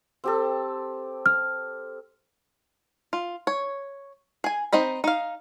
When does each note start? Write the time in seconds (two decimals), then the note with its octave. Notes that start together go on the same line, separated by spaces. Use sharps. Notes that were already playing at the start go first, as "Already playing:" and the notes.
0.24 C4 G4 A4
1.26 F6
3.13 F4
3.47 C#5
4.44 G#4 G#5
4.73 C4 D#4 D#5 B5
5.04 D#4 F5